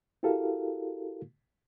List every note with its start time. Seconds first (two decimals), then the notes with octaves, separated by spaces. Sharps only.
0.23 E4 F#4 G4 A4 A#4 F5